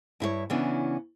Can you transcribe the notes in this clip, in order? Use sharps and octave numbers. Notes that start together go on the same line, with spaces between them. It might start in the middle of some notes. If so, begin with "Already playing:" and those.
G2 E4 G#4 C#5
C#3 E3 B3 C#4 D4 E4